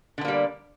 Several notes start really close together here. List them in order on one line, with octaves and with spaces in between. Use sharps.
D3 B3 A#3 G3